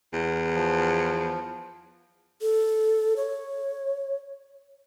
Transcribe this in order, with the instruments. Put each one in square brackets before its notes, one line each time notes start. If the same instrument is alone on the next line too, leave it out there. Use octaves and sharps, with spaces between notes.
[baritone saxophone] E2
[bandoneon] F3
[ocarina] A4
C#5